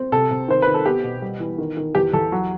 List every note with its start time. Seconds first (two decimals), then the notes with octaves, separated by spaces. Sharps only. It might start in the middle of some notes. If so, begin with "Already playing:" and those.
Already playing: C4
0.12 C3 A4
0.31 C3
0.48 D#3 C5
0.62 D#3 B4
0.74 A4
0.86 B3 G4
1.04 B2
1.22 G3
1.40 E3
1.58 D#3
1.77 D#3
1.95 E2 G4
2.13 E2 A4
2.32 F#3